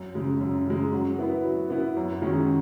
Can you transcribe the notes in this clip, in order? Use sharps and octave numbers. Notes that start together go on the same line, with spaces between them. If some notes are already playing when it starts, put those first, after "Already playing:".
Already playing: F#2
C#3 G#3
F#2
C#3 G#3
F#3
B3 E4 B4
F#3
B3 E4 B4
F#2
D#3 G#3 C#4 F#4